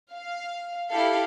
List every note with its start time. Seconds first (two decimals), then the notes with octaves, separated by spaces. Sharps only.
0.13 F5
0.91 E4 G4 A4 F5